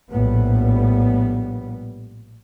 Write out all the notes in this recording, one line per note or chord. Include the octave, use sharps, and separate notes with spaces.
A#1 A2 G3 B3